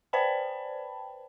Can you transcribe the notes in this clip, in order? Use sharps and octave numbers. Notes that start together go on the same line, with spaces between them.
B4 C5 D5 G5 A5 B5